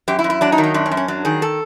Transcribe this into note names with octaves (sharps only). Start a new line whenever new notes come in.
F#2 G4
E4
F#2
E4
F#3 D4
D#4
D#3
D#4
F#2 D4
C#4
F#2
C#4
F#3 D4
D#3 G#4
A4